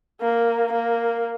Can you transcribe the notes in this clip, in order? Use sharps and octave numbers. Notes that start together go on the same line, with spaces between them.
A#3
A#3